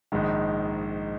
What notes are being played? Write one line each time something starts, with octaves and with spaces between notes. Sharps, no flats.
A#1 G#2 D#3